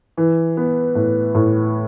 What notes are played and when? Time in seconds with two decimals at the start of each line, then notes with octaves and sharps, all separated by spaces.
0.17 E3
0.57 B3
0.95 A2
1.35 A2